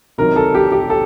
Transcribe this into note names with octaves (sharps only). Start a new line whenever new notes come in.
C3 D#3 F#3 A#4
A4
G4
G4
A4